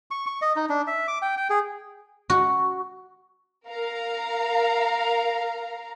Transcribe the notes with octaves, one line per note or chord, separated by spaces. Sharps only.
C#6
C#6
D#5
D#4
D4
E5
D6
G5
G5
G#4
F#4
A#4 F5 A#5